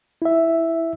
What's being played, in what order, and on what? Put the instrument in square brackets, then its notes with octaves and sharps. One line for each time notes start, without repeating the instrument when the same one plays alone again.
[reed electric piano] E4 E5